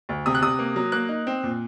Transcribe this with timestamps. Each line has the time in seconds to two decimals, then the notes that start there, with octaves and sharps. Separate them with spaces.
0.09 D2
0.26 C3 D#6
0.35 F#6
0.42 C3 D#6
0.59 A#3
0.76 F#3
0.92 A#3 F#6
1.09 D#4
1.27 C4
1.43 A#2